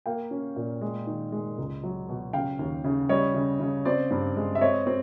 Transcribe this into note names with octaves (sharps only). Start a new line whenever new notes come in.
A#3 F5 G5
C#4
A#2
G#3
D#3
G#3
C#2
F#3
B2
C#3 F5 G5
D#2
C#3
G3 C#5 D#5
C#3
C#3
C4 C5 D5
G2
G#3
E5
C4 C#5 D#5
C4